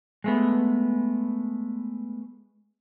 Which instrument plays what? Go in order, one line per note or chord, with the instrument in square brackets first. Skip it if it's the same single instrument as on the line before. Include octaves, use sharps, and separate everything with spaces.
[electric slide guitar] G#3 A3 B3